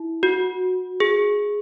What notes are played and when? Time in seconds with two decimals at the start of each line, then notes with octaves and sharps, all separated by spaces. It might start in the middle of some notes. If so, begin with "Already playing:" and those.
Already playing: E4
0.23 F#4
1.00 G#4